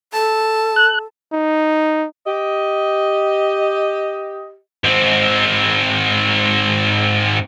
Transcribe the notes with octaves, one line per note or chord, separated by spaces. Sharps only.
A4 A5
F#6
D#4
G4 D#5
G#2 C4